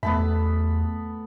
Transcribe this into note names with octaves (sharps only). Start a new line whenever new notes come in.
E2 A3 B3 E5 A5 B5